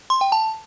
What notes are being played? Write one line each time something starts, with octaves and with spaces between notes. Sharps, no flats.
C6
G5
A5